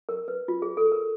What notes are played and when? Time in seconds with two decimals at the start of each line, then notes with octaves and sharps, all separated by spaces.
0.09 A#4
0.28 B4
0.48 F4
0.62 G#4
0.77 A4
0.92 A#4